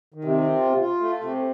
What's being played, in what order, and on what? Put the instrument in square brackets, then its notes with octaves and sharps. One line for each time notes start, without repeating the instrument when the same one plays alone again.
[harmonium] D#3
[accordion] C3
[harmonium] C4
F4
F4
A3
C3